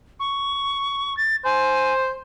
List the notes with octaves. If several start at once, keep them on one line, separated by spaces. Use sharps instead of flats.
C#6
A6
C5 G#5